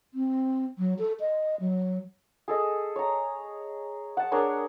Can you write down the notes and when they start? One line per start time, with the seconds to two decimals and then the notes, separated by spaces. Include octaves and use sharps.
0.14 C4
0.78 F#3
0.99 A4
1.20 D#5
1.60 F#3
2.48 G#4 A4 D#5
2.96 C#5 A#5
4.17 F#5 A5
4.32 D4 G#4 A#4 C#5